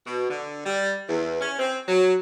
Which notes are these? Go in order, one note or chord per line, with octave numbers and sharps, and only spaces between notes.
B2
D3
G3
E2
C#4
C4
F#3